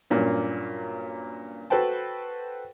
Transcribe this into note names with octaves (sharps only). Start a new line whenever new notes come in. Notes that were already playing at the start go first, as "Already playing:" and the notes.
G2 A#2 F#3 A#3 C#4
F#4 A4 B4 C5 G5 A5